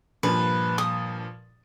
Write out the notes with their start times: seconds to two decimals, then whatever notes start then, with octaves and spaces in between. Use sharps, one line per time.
0.23 G2 A#2 F3 B4
0.78 D#6